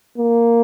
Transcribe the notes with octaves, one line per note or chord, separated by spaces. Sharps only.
A#3